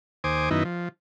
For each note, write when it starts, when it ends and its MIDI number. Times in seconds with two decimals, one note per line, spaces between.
0.24 0.49 39
0.24 0.49 72
0.24 0.49 80
0.24 0.49 86
0.24 0.49 87
0.51 0.63 42
0.51 0.63 51
0.51 0.63 59
0.51 0.63 63
0.51 0.63 64
0.65 0.89 53